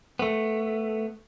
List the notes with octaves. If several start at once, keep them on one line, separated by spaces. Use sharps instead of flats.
A3 B3